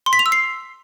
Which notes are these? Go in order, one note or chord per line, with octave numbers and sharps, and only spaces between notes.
C6
B6
F7
E6
C7